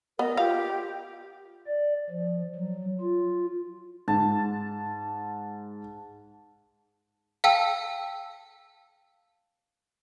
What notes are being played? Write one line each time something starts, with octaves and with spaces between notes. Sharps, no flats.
B3 A#4 D#5
F4 G4 F5
D5
F3
F#3
F4
G#2 A5
F5 G5 A5 E6